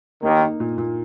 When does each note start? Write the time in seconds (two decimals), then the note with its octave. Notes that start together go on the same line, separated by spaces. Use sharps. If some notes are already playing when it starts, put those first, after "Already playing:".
0.23 D#2 D#3 A#3
0.41 D#4
0.60 A#2
0.78 A#2